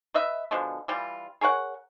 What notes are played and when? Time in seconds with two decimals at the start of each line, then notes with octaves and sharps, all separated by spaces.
0.14 B4 D#5 E5
0.51 B2 D3 F3 G#3
0.88 E3 G3 F4
1.41 G#4 A#4 C#5 F#5